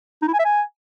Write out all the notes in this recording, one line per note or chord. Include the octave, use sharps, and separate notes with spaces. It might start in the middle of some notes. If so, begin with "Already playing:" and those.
D#4
E4
G#5
E5
G#5